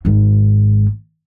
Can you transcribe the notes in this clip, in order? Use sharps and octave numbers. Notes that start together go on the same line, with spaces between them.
G#1 G#2